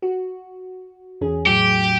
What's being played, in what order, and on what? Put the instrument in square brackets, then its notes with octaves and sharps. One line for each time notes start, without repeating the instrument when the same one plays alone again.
[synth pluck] F#4
E2 C#4 G#4
[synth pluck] A2 F#3 [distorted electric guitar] G4